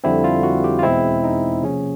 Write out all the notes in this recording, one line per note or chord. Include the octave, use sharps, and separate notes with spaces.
F2 D3 G3 C4 E4
F4
F#4
G4
F4
E2 B2 G#3 C4 E4
D#4
C3 F3 A#3 C#4 G#4